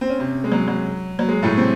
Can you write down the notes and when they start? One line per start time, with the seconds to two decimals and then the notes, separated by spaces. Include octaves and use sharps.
0.01 C4
0.09 C#4
0.19 C3 C4
0.44 G#3
0.52 F#3
0.68 F#3
1.19 F#3
1.28 G#3
1.43 A2 A3
1.57 C3 C4